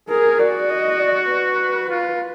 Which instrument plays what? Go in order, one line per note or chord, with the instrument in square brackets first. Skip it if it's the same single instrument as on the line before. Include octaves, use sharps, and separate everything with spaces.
[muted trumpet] G#4 [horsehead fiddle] A#4
[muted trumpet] F#4 [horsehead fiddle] D5
[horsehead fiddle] D#5
D5
B4
[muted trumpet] F4